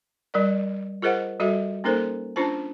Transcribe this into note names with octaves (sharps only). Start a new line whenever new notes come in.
G3 A#4 D5
F4 G#4 A#4 C5 D#5 F#5
G3 F#4 A4 E5
A#3 C#4 D#4 A4 A#4 C5
C#4 D4 F4 C5 A5